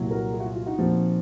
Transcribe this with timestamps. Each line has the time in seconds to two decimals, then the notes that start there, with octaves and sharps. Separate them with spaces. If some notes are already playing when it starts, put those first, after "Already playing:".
Already playing: C2 A#2 F#3
0.11 F#4 A#4
0.33 F4 G#4
0.40 F#4
0.45 F4
0.55 F4
0.66 D#4 F#4
0.78 A#2 F3 C4